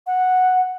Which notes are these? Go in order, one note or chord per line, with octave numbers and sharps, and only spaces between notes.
F#5